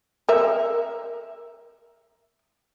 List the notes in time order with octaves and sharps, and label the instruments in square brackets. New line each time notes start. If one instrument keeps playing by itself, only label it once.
[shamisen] A#4 E5